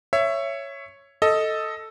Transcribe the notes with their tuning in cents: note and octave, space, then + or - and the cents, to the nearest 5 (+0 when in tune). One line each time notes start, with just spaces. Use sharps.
C#5 +0 E5 +15
A4 +0 D#5 +10